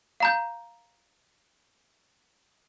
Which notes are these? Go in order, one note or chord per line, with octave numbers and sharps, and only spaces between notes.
F5 A#5 G6